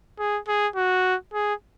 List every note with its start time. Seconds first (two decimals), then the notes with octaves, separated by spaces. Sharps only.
0.19 G#4
0.48 G#4
0.76 F#4
1.34 G#4